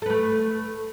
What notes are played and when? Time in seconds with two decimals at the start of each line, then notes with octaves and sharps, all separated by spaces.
0.02 A4
0.06 B4
0.10 A3